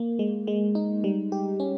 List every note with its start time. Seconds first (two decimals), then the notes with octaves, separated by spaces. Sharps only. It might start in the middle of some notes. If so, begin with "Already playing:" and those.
Already playing: A#3
0.19 G#3
0.47 G#3
0.75 D#4
1.04 G3
1.32 G4
1.60 C#4